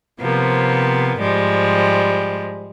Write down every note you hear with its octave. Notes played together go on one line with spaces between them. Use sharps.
C3 F3 A#3 B3
G#2 F3 G3 G#3